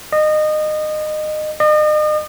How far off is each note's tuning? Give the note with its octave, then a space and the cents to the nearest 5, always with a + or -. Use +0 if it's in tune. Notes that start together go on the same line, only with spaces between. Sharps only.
D#5 -25
D#5 -40